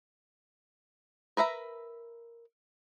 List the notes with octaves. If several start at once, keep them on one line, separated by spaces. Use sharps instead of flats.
A#4 B4 E5 A#5